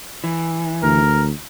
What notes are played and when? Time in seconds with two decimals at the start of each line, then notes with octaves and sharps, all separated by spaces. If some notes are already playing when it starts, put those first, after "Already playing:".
0.24 E3
0.83 D2 A#4